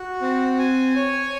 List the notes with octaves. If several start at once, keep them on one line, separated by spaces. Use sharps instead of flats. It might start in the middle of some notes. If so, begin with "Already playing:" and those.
Already playing: F#4
C4
G#5
C#5